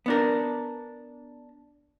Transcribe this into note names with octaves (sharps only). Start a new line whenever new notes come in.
B3 D4 A#4